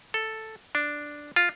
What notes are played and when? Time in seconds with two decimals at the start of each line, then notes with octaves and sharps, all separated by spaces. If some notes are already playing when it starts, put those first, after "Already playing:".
0.14 A4
0.75 D4
1.36 F4